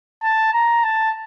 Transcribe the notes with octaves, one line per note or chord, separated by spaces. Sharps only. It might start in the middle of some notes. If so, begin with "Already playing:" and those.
A5
A#5
A5